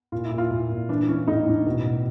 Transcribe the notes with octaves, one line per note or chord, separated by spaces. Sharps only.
A#2 F4
E4
A#2
F4
A#2
A#2
E3 D4
E3 C#4
A2 D#4
A2 D4
B2
B2